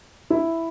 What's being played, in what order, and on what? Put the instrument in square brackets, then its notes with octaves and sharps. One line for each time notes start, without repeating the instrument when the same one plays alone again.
[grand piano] E4